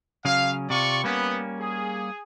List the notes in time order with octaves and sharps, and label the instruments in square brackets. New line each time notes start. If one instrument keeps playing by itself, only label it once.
[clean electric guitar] C#3 F#3 C#4 [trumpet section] F5
[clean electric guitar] C3 [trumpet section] F4 D5 C#6
[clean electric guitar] G3 A#3 C#4 [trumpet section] B3
[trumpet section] G#4